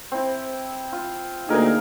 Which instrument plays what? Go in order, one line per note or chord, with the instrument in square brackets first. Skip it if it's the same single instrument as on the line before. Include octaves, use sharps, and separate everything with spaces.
[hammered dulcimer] C4 E4
F4
[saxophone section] D2 A#3 D#4 [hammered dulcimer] G#4 A#4 G#5